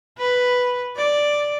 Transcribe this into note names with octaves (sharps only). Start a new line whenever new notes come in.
B4
D5